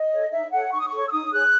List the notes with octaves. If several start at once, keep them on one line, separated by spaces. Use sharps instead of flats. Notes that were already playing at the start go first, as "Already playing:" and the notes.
Already playing: D#5
A4 C#5
D#4 E5
A4 C#5 F#5
D#4 C#6
D#6
C#6
A4 C#5
E6
D#4 D#6
G#4 C#5 F#6